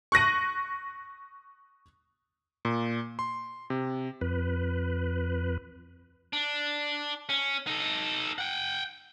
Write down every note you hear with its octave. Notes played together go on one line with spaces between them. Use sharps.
C#6 F#6 A#6 D#7
A#2
C6
C3
F2 B4
D4
C#4
D#4 A4
F#5 G5